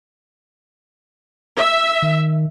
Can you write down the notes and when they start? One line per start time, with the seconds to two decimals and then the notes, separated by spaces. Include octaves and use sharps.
1.57 E5
2.02 D#3